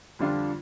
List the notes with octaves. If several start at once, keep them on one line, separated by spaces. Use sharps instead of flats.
F2 D3 G3 D4 F4